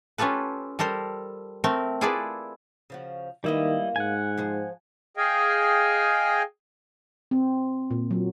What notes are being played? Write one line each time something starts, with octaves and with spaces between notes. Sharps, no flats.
C#4 F4 G4 A4 B4
G3 A4 A#4 C5
A3 C4 A#4
E4 F4 G#4 A4 B4 D5
C#3 F3 F#4
D#3 G3 G#3 A#3 B3 E4 D#5
G#2 F#5 G#5
F3 G#4 C5
G#4 D#5 F5 G5 G#5
C4
A#2
F#3